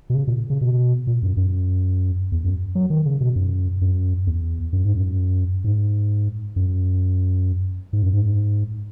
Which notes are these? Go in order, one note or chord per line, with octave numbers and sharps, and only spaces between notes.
B2
C#3
A#2
C#3
B2
A#2
F#2
F#2
E2
F#2
F#3
D#3
C#3
B2
F#2
F#2
E2
F#2
G#2
F#2
G#2
F#2
G#2
F#2
G#2